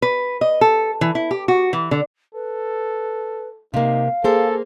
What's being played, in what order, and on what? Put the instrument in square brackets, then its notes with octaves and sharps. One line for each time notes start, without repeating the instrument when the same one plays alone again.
[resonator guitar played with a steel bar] B4
D#5
A4
E3
E4
G4
F#4
E3
D3
[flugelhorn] A4 [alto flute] B4
[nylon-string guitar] C3 A#3 [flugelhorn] D#4 [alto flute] F5
[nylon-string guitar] A#3 C5 [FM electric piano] G#4 [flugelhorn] A4